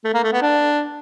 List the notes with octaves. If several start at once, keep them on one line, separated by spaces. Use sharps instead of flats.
A3
A#3
A3
B3
D4